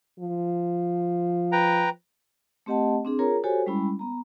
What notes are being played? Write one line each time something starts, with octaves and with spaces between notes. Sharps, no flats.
F3
B4 G5 A#5
A3 C4 G4 D#5 F#5 A5
C4 D4 G#4
F4 G#4 A#4 C#5 A#5
F#4 G4 A4 C5 C#5 G#5
G3 G#3 C#4 E4 B5
B3 A#5